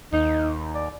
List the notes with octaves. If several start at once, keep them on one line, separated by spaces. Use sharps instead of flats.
D#2 D#4
D5